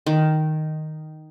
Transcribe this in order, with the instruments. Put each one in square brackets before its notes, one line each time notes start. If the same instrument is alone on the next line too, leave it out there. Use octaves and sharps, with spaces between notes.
[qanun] D#3